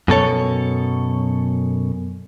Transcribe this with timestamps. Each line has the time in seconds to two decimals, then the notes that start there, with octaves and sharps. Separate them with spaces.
0.08 F#2 B2 A4 C#5